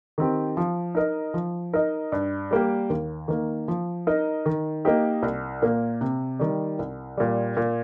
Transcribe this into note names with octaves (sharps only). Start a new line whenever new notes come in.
D#3 C4 G4
F3
D#4 A#4 D#5
F3
D#4 A#4 D#5
G2
G3 A#3 G4
D#2
D#3 A#3
F3
D#4 A#4 D#5
D#3
A#3 D#4 G4 D#5
C2
A#2 A#3
C3
D#3 G3
C2
A#2 G3
A#2